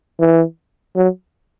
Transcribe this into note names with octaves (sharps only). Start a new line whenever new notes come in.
E3
F#3